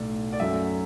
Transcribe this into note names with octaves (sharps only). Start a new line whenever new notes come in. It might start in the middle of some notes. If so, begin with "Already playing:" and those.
Already playing: B1 A2 A3 D5
D5
F#2 F#3 A3 E5